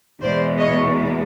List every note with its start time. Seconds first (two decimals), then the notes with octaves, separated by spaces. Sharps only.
0.22 E2 B2 G#3 C5 D5
0.59 C#5 D#5